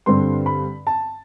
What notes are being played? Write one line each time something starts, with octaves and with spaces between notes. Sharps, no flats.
G2 D3 G3 C4 C6
B5
A5